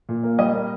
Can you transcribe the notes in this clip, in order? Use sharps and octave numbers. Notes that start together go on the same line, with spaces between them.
A#2
A#3
G3 D#5
A#3